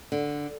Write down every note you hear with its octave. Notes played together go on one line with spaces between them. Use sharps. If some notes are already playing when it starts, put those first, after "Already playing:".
D3